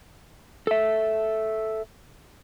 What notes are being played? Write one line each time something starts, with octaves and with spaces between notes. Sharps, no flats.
A4 E5